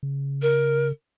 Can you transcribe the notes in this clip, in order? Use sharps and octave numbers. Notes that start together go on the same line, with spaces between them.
C#3
A#4